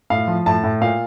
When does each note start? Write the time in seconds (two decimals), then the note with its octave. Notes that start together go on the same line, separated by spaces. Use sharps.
0.10 A2 F5
0.28 F3
0.46 A2 A5
0.64 A2
0.81 A#2 F5